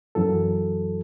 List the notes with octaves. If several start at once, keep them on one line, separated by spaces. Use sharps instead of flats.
F#2 E3 F#3 A4